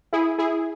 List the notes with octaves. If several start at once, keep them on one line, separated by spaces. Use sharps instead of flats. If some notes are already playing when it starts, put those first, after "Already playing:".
E4 G#4
E4 G#4